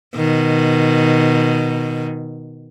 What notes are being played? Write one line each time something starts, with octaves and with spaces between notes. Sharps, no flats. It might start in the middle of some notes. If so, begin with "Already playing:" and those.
B2 D#3